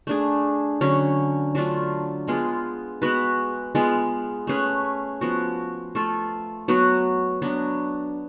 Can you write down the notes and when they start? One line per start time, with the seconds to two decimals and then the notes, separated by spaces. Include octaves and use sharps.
0.07 A3 D4 G#4
0.81 D3 F#3 C#4
1.55 F#3 A3 D4 F4
2.28 G#3 B3 F4 G#4
3.02 G#3 B3 F#4 B4
3.75 G#3 B3 F4
4.47 A3 C#4 G#4 B4
5.21 F3 B3 F#4
5.95 A3 F4 A4
6.68 F#3 B3 F#4
7.42 F#3 B3 D4